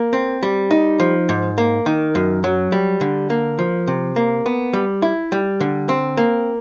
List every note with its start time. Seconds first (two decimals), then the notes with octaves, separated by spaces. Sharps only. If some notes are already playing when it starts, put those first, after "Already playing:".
Already playing: A#3
0.13 C4
0.43 G3
0.71 D#4
1.00 F3
1.29 G#2
1.58 A#3
1.86 D#3
2.15 F#2
2.44 F#3
2.72 G3
3.01 D3
3.30 A#3
3.59 F3
3.87 C3
4.16 A#3
4.46 B3
4.73 G3
5.02 E4
5.32 G3
5.60 D3
5.89 C4
6.17 A#3